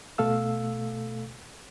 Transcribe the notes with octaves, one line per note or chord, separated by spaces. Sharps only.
B2 A3 A4 F5 E6